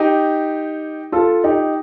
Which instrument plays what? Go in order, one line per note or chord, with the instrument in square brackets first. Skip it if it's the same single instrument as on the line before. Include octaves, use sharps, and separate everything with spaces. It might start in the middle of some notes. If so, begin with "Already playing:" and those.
Already playing: [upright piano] D#4 G4
F4 A4
D#4 G4